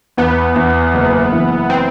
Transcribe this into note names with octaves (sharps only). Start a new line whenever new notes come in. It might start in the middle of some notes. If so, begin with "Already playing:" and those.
E2 B3
E2
F#1
E3
C4